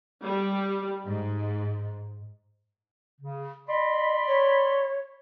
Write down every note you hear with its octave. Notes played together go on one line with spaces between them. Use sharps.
G3
G#2
C#3
D5 D#5 B5 C6
C#5